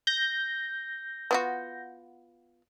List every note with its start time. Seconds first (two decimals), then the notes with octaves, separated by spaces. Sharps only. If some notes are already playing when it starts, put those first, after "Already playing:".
0.07 G6 A#6
1.31 B3 F4 F#4